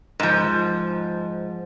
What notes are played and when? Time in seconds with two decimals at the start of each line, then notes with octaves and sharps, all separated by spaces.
0.20 G#2 F3